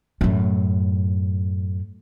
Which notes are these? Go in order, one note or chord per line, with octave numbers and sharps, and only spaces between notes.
F#2 A2